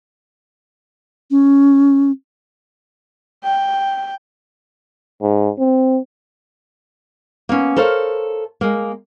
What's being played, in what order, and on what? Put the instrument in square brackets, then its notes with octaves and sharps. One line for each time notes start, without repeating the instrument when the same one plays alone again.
[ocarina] C#4
[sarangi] G5
[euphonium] G#2
C4
[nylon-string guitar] A#3 B3 C#4
A4 A#4 C5 C#5 F5
G#3 A#3